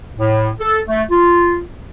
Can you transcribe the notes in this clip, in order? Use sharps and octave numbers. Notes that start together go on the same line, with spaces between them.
A2
A4
A3
F4